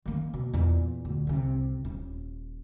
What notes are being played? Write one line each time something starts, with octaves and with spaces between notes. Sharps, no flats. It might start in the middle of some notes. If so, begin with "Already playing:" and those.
D#3 A#3
B2
E2 A#2
D2
C2 C3
D#1